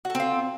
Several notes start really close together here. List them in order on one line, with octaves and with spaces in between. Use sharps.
F#4 A4 C4 F4